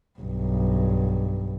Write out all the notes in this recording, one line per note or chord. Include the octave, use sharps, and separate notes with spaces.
B1 G2